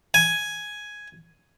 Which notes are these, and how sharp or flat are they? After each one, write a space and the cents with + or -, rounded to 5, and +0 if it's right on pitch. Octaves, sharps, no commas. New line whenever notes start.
G#5 +5